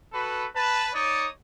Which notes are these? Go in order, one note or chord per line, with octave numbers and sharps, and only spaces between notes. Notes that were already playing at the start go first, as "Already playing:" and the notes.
F#4 A4 B4
B4 A5
D#4 C#5 D5 D#6